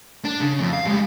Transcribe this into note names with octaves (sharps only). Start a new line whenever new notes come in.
D4
C#3
F2
F5
G3 G#3